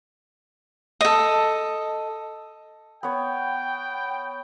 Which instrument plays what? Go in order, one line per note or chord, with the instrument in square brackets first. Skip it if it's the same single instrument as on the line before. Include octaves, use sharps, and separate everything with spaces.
[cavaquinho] A4 D#5
[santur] B3 C#5 [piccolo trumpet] G5